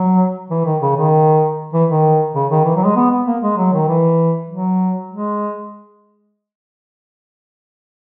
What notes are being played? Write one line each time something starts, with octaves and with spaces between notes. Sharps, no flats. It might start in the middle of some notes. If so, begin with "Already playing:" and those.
Already playing: F#3
E3
D#3
C#3
D#3
E3
D#3
C#3
D#3
E3
F#3
G#3
B3
B3
A#3
G#3
F#3
D#3
E3
F#3
G#3